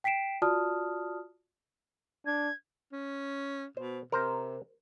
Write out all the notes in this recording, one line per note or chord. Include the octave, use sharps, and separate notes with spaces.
G5 B6 C7 D7 E7
F4 F#4 D5 A5 D#6 F6
D4 G#6
C#4
B2 C5
C3 A#4 C5 A#5